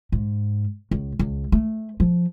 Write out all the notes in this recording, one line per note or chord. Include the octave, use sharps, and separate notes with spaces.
G#2
C#2
C#2
A3
F3